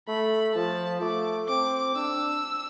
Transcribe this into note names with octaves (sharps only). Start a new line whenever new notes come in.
A3 B5
F3 A5
A3 D6
C4 D6
D4 E6